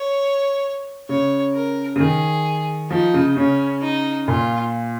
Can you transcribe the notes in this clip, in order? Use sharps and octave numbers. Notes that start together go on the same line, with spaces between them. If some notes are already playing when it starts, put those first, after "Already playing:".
Already playing: C#5
C#3 C#5
A#4
C#3
D#3 G#4
F3 D#4
C#3
C#3 C#4
D#4
A#2 F4